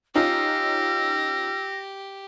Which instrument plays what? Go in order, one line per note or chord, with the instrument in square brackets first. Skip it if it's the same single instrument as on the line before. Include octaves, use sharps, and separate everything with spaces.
[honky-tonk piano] C#4 D#4 F4 [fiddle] G4 [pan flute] E6 [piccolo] A#6